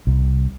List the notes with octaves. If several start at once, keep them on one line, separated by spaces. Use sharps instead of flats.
C2